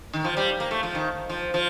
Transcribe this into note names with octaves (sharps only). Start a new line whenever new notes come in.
D#3
F3
G3
A#3
A3
F3
D#3
F3
F3